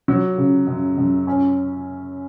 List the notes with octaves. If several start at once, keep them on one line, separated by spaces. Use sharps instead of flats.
F#3
C#3
F#2
F#2
C#4